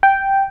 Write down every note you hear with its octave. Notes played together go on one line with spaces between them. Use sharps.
G5